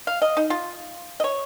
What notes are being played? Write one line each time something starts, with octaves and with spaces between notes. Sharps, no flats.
F5
D#5
D#4
F4
D#5
C#5